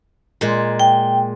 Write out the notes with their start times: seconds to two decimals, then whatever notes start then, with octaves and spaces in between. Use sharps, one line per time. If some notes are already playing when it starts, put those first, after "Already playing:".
0.41 A#2 G#3
0.80 G5